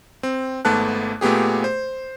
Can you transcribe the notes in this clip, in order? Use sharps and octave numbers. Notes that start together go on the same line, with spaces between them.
C4
G#1 G#2 A3 B3 A5 F#6
A#2 A3 B3 G4 G#4
C5